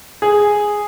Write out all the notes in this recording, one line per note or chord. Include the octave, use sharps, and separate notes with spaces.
G#4